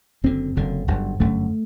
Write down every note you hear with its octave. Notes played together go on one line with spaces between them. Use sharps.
F#1 F#2 D3 C4
F#1 F#2 D3
G1 F#2 D3
G1 F#2 D3 A3